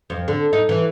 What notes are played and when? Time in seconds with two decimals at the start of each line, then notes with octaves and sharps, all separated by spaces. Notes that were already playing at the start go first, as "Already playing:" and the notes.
0.10 F2
0.28 D3
0.53 D#4
0.69 E3